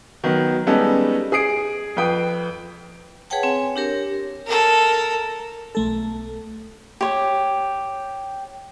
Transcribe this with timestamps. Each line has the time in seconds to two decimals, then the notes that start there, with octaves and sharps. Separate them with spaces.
0.24 D#3 F#3 B3
0.67 G3 G#3 B3 C#4 D#4 A4
1.32 G#4 D#6 C7 D7
1.96 F2 B4 G5 D#6
3.30 G#4 B4 C#5 F#5 G5 A5
3.43 C4 C#5 G#5
3.76 D4 G4 A#4 C#5
4.46 A4 A#4
5.75 B1 A3 A4
7.01 G4 C#5